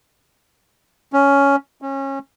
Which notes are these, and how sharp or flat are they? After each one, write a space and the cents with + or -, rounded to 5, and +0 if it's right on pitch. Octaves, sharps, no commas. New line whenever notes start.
C#4 +10
C#4 -25